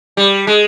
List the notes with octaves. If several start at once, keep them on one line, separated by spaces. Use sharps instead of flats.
G3
G#3